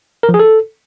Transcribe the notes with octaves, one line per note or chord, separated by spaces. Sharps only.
A#4
F3
G#4
A4